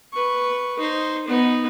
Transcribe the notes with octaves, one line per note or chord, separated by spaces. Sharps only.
B4 C#6
D#4 C5
B3 D#4